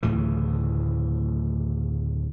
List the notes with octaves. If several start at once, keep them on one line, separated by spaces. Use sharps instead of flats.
D2 A2 C#3 E3